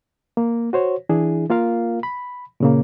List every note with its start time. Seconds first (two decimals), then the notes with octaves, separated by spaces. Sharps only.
0.37 A#3
0.73 F#4 C5 C#5
1.09 E3 D4 E4 G#4
1.50 A#3 F4 A#4 F5
2.03 B5
2.60 A#2 C#3 A#3